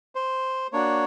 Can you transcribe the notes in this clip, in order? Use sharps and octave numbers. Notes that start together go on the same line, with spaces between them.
C5
A#3 D4 F#4 C#5